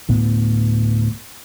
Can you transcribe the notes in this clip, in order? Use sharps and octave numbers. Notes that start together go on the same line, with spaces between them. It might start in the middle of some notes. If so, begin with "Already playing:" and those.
D2 A2 B3